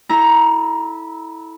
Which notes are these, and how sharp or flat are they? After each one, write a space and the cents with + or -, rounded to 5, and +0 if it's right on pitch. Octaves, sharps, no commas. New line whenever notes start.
E4 -20 A4 -15 A#5 +10